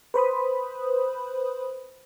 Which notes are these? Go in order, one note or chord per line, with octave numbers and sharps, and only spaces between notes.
B4 C5 B5 D#6